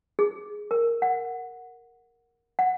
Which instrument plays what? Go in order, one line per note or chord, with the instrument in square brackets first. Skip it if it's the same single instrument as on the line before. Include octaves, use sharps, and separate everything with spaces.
[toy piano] G#4
A#4
F#5
F#5